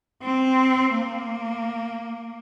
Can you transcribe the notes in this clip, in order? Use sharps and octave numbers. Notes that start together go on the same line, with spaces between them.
C4
A#3